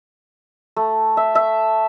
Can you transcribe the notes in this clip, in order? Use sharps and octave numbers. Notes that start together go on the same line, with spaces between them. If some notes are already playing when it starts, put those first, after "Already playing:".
A3
E5
E5